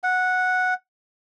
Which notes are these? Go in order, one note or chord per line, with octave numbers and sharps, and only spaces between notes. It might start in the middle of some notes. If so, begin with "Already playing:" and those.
F#5